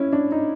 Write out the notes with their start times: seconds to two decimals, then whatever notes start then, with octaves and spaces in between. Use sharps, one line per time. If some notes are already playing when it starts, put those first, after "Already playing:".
Already playing: C#4 E4
0.13 D4
0.32 D#4